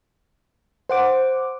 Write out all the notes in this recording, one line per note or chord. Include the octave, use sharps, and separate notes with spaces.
C5 F#5 D6